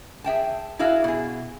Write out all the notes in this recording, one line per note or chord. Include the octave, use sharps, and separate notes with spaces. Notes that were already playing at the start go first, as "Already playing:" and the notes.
G#4 E5 G5 A5
E4 F#4 G#4 E5 F5
B2 G#4